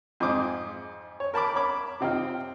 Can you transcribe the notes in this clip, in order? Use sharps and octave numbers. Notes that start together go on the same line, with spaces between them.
F2 G#2 G#4 C5 D6 D#6
C#5
A#4 A5 B5 D6
A#4 C#5 B5 D6
C3 C4 D#4 F4